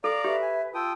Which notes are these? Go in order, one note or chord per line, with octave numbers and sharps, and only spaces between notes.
A4 D5 F5 A#5 D6
G4 B4 E5
G#5
F4 G5 A5 D#6 E6